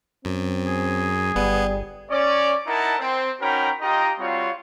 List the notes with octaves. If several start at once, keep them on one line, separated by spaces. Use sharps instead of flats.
F#2 C4
G#4
G1 G3 B3
C#4 C#5 D5
D#4 E4 A#4 F#5 A5
C4
C#4 D#4 F#4 A#4 G5 B5
D#4 F4 G4 D#5 G5 A#5
G3 C4 F4 F#4 C#5 F5